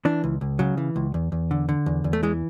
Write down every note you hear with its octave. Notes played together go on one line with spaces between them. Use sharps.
E3 D4
C#2
C#2
C#3 F#3
E3
C#2
E2
E2
D3
D3
E2
E2
A3
E3 G#3